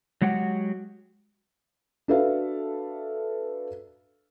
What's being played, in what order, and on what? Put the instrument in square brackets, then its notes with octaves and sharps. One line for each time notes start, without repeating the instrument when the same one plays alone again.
[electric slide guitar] F#3 G#3 F#4 G4 B4 F#5
[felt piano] D4 F#4 A4 B4 E5 F5